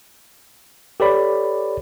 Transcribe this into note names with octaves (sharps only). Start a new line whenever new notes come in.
G4 A4 B4 C#5 D5 B5